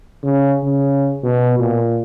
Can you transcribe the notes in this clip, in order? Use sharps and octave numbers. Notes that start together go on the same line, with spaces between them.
C#3
C#3
B2
A#2